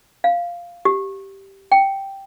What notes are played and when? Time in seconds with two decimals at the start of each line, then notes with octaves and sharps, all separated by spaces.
0.24 F5
0.85 G4
1.72 G5